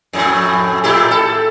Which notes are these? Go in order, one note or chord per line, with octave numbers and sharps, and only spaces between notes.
F2 A2
A2 E4 G4
A4